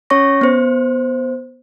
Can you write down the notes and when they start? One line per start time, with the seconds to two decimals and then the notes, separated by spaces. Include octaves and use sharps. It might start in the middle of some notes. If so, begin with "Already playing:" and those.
0.10 C#4 C#5 C#6 A#6
0.41 B3 C5